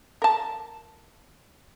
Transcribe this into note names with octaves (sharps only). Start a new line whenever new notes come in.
A#4 A5